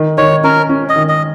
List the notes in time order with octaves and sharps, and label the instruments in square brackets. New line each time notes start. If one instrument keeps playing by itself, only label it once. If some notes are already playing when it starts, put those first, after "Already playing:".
Already playing: [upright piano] D#3
[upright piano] D#3 [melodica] C#5
[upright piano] C#4 [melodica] A#4
[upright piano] C#4
[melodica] D#5
[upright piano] D#3
[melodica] D#5